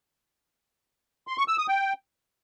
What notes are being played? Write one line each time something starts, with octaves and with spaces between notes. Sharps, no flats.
C6
C#6
E6
D#6
G5